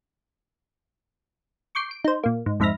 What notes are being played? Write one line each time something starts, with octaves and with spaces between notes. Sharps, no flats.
C#6 D6 G6 C7
D7
D#4 C5
A#2 A#3
G#2
F2 G#2 E5 B5 F6 A#6